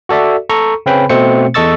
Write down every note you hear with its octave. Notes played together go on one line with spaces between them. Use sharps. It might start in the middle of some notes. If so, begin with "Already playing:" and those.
F#4 A4 D5 E5
A4 A#5 C#6
C#3 C4 C#4 B4 G5 B5
B2 A3 C4 C5 C#7
E2 A4 D#5 C#6 E6 A6